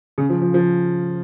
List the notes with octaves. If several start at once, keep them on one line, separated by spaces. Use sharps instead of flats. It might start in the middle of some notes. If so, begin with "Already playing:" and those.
C#3
F3
F3
F3